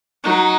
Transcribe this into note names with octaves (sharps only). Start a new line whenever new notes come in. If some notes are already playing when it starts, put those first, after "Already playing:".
F#3 D#4